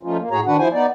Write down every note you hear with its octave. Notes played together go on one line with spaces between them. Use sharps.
F3 A3 C#4 D#4 F4
A#3
A2 F#4 G#4 C#5 A#5
D#3 D4 F#4 B4 F#5
F3 E4 C5 G#5
B3 D#4 D5